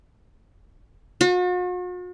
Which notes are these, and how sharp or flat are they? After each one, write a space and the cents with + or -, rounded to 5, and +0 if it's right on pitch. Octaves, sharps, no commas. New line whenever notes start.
F#4 -45